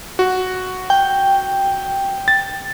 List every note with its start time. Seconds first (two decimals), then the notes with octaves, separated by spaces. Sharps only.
0.19 F#4
0.90 G5
2.28 A6